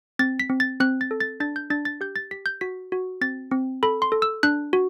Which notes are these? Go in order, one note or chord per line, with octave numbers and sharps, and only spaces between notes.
C4 A6
B6
C4
A6
C4 F#6
A6
A4
A6
D4 A6
G6
D4 A6
A6
G4 G6
A6
G4 B6
G6
F#4 B6
F#4
C4 A6
C4
A4 B5
C6
A4
E6
D4 F#6
F#4